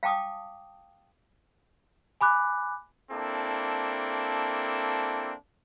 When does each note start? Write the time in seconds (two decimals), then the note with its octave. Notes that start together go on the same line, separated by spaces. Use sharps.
0.03 F5 G5 A5 D6 D#6
2.21 G#5 B5 D6 F#6
3.11 A#3 C4 D4 E4 A4